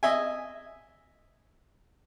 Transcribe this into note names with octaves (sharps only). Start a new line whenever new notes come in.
D#5 E5 G#5